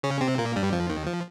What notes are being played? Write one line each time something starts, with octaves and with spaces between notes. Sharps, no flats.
C#3 C#4
C3 C4
A#2 A#3
G2 G3
F2 F3
D#2 D#3
F3